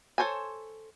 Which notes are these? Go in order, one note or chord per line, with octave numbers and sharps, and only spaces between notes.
A4 A#4 C5 C#5 G#5